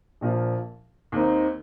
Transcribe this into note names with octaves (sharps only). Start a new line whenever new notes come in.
A#1 A#2 F3
D#2 D#3 C4 D#4